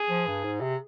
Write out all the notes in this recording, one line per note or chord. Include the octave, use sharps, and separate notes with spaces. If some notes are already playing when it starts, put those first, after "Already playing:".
Already playing: G#4
F3
G2
G#2
C3